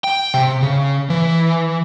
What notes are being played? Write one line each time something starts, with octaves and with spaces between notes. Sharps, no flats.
G5
C3
C#3
E3